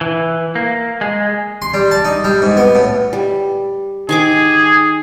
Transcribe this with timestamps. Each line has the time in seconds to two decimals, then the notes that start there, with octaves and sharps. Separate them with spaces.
0.01 E3
0.55 A#3
1.01 G#3
1.62 C6
1.74 G3
1.91 A5
2.05 D#4
2.24 G3
2.42 G#2
2.57 B3
2.75 A2
3.13 G3
4.09 D#3 G#4 C#6 D6